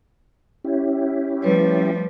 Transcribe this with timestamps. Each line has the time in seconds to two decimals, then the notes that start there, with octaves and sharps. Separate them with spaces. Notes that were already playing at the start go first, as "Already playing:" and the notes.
0.64 C#4 E4 G4
1.42 F3 G3 A3 B4 C#5